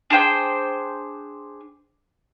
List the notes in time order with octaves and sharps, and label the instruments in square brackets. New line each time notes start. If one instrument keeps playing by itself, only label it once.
[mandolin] D4 G#4 C5 G5